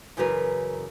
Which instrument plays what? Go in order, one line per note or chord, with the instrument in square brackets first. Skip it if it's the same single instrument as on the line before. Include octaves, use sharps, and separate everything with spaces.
[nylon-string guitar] F#2 C#3 E3 F#4 A#4 B4